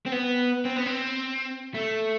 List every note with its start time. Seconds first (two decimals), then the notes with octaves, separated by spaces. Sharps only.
0.06 C4
0.12 B3
0.65 C4
0.76 B3
0.85 C4
1.74 A3